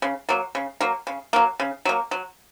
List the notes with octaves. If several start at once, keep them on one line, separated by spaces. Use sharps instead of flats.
C#3
F#3 A#3
C#3
F#3 A#3
C#3
F#3 A#3
C#3
F#3 A#3
F#3